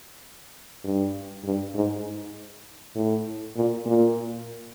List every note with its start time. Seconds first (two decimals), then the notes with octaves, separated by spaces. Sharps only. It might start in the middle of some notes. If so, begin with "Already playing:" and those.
0.84 G2
1.44 G2
1.75 G#2
2.96 A2
3.56 A#2
3.86 A#2